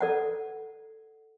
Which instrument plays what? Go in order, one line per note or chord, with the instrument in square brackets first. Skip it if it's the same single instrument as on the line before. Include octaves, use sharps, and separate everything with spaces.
[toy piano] A4 D5 F#5